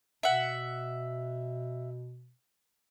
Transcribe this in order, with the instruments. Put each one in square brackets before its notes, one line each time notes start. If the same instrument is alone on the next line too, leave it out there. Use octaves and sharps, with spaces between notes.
[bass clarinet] B2 [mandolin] E5 F#5